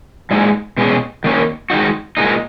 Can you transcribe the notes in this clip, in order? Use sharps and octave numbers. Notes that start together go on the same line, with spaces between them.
A#2 G#3 D#4 G#4
B2 G#3 C#4 G#4
D#3 A#3 C#4
D#3 G#3 D#4 F#4
A#2 G#3 D#4